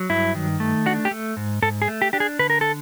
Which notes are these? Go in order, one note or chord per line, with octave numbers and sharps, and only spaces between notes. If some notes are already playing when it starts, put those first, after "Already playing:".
Already playing: F#3
G2 E4
D#3
A3
D4 F#4
G4
A3
G#2
G#2 A4
G#4
A3
G4
D4 G4
G#4
D3 B4
A#4
A4